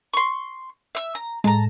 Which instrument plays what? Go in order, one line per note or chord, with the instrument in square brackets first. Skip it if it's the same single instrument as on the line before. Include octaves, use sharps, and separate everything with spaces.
[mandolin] C6 C#6
E5 E6
A#5
[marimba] A2 [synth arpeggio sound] G#3 [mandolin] A5 A#5